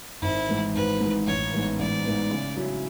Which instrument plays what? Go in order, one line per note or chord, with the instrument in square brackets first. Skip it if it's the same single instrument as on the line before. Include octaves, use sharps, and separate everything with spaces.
[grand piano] G#1 [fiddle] E4
[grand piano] G#2 E3
[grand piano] G#1 [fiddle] B4
[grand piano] G#2 E3
[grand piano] A1 [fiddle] C#5
[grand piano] G#2 E3 B3
[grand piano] A1 [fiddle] D5
[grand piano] G#2 E3 B3
C#3
F#3 C#4 E4